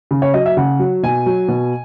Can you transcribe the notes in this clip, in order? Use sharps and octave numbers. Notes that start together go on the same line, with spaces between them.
C#3
C#5
F#3 D#5
E5
C#3 F#5
F#3
B2 G#5
F#3
B2